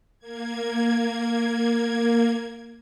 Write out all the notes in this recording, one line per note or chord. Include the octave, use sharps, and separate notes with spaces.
A#3 G#6